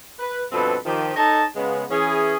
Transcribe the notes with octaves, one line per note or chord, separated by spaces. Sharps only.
B4
G2 B2 F3 C4 A4 B4
D#3 F3 G4
D#4 A4 C#5 D#5 A5
C#3 G#3 B3
E3 C#4 G#4